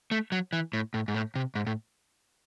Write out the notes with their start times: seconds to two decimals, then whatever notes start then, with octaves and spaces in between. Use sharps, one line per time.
0.11 A3
0.32 F#3
0.53 E3
0.73 A2
0.94 A2
1.08 G#2
1.14 A2
1.35 C3
1.55 G#2
1.67 A2